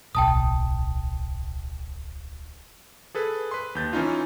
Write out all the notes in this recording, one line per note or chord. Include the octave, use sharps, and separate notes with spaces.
D1 B1 G5 A5 D#6
G#4 A4 B4
B4 C6
D#2 G6 A6
E3 C#4 D#4 F4